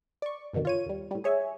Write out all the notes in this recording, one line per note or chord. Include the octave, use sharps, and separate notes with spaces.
D5 C#6
F#2 B2 D3 D#3
F4 C#5 D#7
D#2 G3
A2 G3
G#4 C#5 E5 G#5